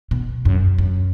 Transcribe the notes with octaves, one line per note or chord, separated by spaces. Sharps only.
B2
F#2
F#2